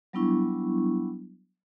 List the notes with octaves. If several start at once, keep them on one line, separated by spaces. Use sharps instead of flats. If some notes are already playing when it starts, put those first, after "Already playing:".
F#3 G3 B3 D4 E4 C#6